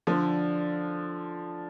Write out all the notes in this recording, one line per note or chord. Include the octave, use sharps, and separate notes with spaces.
D3 F3